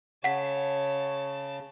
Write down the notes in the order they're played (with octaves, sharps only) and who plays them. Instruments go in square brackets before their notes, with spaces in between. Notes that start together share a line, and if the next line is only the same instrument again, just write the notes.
[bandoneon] C#3 [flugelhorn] C#5 [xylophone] F#5 B6 [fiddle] A5